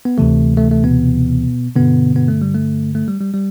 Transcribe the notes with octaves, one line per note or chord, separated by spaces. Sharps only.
B3
D2 C3 E3 A3
A3
A3
B2 B3
G2 B2 D3 B3
B2 B3
A3
G3
A3
A3
G3
G3
G3